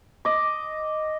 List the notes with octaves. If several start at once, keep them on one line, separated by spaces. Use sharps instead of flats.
D#5 D6